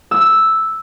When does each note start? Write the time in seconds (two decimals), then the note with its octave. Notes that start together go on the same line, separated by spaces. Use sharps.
0.11 E6